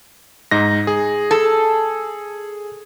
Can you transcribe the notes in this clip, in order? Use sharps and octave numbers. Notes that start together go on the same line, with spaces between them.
G#2 D#4 A#6
G#4
A4